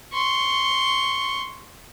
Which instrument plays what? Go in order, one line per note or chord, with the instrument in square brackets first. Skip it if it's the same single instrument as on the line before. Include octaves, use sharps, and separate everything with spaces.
[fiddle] C6 C#6